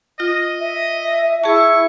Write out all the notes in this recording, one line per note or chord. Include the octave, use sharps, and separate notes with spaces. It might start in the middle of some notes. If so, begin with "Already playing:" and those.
F4 D#5
E5
E4 G#4 A5 C#6